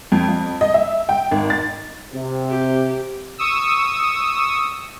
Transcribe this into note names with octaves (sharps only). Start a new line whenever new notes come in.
F2
F2
D#5
E5
G5
G#1
A6
C3
G4
C#6 D#6 E6